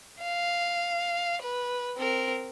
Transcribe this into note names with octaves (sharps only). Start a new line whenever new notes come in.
F5
B4
C4 A#4